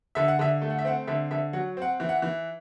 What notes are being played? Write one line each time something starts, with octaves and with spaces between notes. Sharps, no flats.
D3 E5
F#5
D3 E5
A3
F#5
E5
C4 F#5
D3 E5
D3 E5
F#3 F#5
C4 F#5
E3
F#5
E3